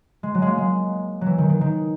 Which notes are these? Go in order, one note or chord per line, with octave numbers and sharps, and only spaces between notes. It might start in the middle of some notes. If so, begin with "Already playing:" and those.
G#3
F#3
G#3 A#3
G#3
F#3
E3
D#3
D#3
D#3